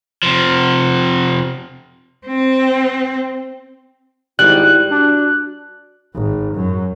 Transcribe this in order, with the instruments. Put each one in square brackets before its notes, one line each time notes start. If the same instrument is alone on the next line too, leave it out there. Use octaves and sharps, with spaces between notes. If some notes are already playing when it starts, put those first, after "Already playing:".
[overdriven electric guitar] C3 F3
[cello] C4
[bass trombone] G#1 [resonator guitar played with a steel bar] G3 [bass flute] E4 [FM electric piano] F#6
[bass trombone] D4 [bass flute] F#4
[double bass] G#1
F#2